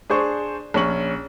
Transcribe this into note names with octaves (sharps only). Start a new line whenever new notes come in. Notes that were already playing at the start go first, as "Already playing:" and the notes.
D4 G#4 C5 C#6
A#1 C#4 C#6 F#7